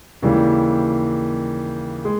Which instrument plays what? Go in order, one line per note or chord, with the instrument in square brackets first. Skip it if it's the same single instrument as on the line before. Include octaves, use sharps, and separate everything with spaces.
[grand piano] D#2 C#3 E3 G3
G#3